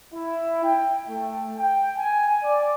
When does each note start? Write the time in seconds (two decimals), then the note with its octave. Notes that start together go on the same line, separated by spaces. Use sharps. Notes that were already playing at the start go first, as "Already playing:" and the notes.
0.13 E4
0.63 G5
1.08 A3
1.58 G5
1.97 G#5
2.43 D5